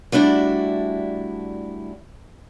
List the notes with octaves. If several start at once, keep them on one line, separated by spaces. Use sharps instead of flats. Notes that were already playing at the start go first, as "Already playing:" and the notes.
G3 A3 D4 E4 F#4